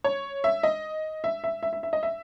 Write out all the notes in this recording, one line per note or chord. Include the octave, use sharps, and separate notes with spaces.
C#5
E5
D#5
E5
E5
E5
E5
E5
D#5
E5